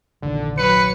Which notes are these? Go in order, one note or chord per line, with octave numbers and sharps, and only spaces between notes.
F1 A#1 D3 D#3
F#3 B4 C#7